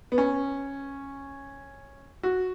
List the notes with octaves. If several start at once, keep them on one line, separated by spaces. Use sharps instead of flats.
B3
C#4
F#4